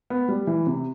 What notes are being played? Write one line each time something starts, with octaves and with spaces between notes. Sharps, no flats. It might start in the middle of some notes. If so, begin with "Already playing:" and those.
B3
G3
E3
C3